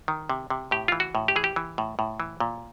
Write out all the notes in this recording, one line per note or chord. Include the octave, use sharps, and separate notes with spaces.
D#3
C3
C3
A2 G4
E3 F4
F#4
A2
G4
E3 G#4
G4
E3
A2
A2
E3
A#2